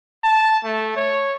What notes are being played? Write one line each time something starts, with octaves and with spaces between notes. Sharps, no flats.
A5
A3
C#5